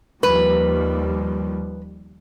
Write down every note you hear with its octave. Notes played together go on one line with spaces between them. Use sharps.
D#2 F3 G3 B4